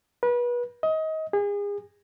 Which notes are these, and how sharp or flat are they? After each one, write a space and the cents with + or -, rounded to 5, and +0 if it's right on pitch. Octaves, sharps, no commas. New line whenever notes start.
B4 -30
D#5 +25
G#4 -35